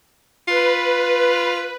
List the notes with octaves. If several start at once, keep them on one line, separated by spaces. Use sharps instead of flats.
F4 B4